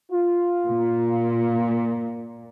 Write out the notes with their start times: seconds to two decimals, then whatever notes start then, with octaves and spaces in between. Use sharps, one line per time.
0.12 F4
0.68 A#2